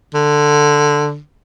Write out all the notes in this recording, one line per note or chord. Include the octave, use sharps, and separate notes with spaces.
D3